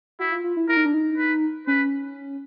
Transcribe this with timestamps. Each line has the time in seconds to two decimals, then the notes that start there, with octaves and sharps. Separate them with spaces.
0.19 E4 F#4
0.32 F4
0.44 F4
0.57 E4
0.68 E4 A#4
0.77 D#4
0.85 D4
0.94 D#4
1.18 B4
1.67 C#4 B4